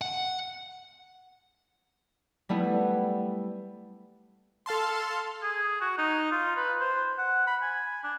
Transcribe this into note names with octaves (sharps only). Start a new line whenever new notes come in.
F#5
G3 A3 B3 E4
A4 F5 A5 C6
G#4
F#4
D#4
F4
B4
C5
F#5
B5
G#5
D4